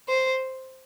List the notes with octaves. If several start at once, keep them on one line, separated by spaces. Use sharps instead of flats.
C5